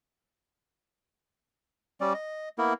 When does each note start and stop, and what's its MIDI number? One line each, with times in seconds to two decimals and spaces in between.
2.01 2.13 55
2.01 2.13 61
2.01 2.13 74
2.14 2.49 75
2.58 2.73 58
2.58 2.73 59
2.58 2.73 64
2.58 2.73 70